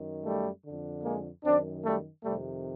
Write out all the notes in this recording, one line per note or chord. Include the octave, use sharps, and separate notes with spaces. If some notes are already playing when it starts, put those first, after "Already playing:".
Already playing: F#2 D#3
G3 A3
F2 D3
G#3 A#3
F#2 D#3 C4 D4
G3 A3
F2 C3 D#3 G3 A3